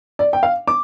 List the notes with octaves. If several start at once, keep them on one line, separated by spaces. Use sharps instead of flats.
D5
G5
F5
D6